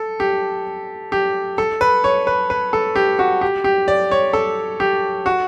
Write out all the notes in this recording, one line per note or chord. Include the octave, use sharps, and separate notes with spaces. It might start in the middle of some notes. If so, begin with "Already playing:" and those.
Already playing: A4
G4
G4
A4
B4
C#5
B4
B4
A4
G4
F#4
G4
G4
D5
C#5
A4
G4
F#4